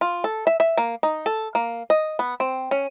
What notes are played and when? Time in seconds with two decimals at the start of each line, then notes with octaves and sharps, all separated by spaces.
0.01 F4
0.24 A4
0.47 E5
0.60 E5
0.77 A#3
1.03 D#4
1.26 A4
1.55 A#3
1.90 D#5
2.19 B3
2.40 C4
2.71 C#4